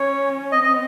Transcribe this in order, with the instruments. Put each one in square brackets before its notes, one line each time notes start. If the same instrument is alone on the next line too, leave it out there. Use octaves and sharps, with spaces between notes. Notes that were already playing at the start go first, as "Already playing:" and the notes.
Already playing: [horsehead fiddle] C#4 [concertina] C#5
[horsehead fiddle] C4 [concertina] D#5
[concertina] D#5